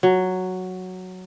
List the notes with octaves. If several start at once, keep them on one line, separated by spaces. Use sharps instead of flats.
F#3